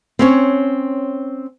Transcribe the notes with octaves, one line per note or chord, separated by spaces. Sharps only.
C4 C#4 C#5